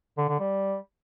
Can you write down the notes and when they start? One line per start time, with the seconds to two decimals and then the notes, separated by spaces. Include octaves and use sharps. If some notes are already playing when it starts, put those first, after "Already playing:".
0.18 D3
0.29 D3
0.40 G3